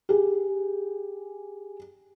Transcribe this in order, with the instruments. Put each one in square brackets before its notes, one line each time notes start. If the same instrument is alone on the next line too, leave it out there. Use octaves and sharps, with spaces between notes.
[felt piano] G4 G#4